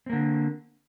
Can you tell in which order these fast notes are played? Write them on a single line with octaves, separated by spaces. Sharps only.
C4 A#3 D3